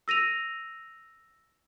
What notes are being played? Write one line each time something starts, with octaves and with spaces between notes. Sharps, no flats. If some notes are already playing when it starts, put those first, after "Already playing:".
E6 A#6 D#7 F7